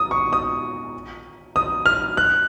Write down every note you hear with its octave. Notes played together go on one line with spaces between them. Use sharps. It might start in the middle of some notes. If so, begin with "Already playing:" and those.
Already playing: D#6
C#6
D#6
D#6
F6
F#6